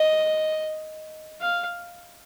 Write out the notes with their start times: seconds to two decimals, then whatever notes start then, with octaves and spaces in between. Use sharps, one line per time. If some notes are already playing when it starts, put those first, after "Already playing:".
Already playing: D#5
1.42 F5